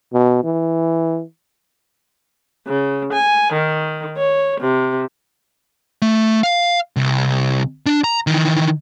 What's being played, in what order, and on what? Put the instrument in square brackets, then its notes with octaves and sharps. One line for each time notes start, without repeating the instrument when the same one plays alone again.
[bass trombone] B2
E3
[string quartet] C#3
G#5
D#3
C#5
C3
[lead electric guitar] A3
F5
C2
D4
A#5
D#3 E3